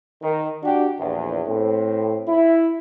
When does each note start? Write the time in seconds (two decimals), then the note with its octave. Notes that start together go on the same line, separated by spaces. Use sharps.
0.22 D#3
0.64 D4 F#4 G4
0.99 A#1 E2
1.47 A2 C4
2.27 E4